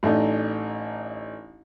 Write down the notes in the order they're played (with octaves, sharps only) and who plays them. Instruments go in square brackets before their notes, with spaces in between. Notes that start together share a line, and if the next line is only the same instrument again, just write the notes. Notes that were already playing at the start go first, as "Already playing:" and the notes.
[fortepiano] A1 A3 D4 D#4